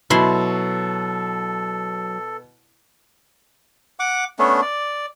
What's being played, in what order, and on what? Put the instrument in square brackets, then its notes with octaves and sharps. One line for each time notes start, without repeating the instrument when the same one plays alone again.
[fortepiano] B2 [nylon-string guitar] F#3 [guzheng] E4 C6 [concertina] A4
[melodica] F#5 D6
A3 B3 C#4 D4
D5